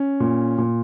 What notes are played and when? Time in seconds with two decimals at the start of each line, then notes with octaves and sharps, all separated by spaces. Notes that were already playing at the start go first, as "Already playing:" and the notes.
Already playing: C#4
0.20 A#2
0.58 A#2